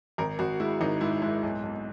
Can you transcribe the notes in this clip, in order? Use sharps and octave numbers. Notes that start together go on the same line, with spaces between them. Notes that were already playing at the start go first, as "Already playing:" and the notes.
G#1 A#4
G#1 F#4
G#3 E4
G#1 D#4
G#2 E4
G#2 E4
B1
B1